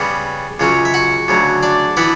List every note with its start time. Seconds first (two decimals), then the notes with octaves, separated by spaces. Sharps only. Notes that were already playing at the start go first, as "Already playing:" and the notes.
Already playing: C#3 G3 B3
0.60 C#2 C#3 F#3 C#4
0.85 E5
0.94 F#4 F#5
1.28 D2 C#3 F#3
1.63 D4 D5
1.97 E3 B3 D4 E4 E5